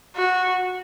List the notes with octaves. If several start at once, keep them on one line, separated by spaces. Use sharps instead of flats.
F#4